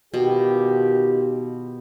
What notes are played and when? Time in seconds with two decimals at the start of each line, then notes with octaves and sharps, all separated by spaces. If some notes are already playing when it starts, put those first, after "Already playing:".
0.14 B2 D#3 F4 G4